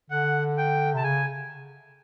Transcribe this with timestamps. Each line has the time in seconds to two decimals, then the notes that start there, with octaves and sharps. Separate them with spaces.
0.10 D3 F#5
0.58 G5
0.94 C3 A5
1.04 C#3 G#5